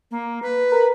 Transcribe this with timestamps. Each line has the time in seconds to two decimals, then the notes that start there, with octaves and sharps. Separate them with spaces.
0.11 A#3
0.43 B4
0.72 A#4